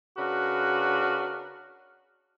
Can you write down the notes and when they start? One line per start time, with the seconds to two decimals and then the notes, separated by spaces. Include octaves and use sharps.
0.17 C#3 D4 F#4 A#4 B4